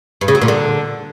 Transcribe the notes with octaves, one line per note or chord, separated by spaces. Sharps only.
G2
C#3
F#3
A#2
D3